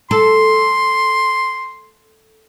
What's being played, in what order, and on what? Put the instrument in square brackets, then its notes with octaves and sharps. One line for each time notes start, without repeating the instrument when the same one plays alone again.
[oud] A4 [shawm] C6